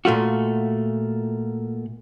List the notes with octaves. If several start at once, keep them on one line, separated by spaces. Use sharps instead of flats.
A#2 A3 F4 F#4